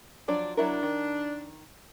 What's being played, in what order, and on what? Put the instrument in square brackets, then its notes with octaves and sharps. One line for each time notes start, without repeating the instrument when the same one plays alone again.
[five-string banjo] F3 F#3 D4 [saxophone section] D5
[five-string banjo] F#3 E4 A#4 [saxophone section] D4
[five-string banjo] D#3